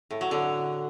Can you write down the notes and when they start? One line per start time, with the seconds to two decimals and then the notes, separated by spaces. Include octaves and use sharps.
0.11 A2
0.21 F#3
0.31 D3